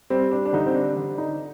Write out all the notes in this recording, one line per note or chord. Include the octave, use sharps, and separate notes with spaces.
G3 C4
D4
D4
D3 D#4
C4
D4
D3
D#4